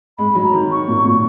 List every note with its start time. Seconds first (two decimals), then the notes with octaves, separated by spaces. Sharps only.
0.18 G#3 B5
0.35 F#3
0.44 A#5
0.53 D#3
0.71 C#6
0.88 A#2
1.05 A#2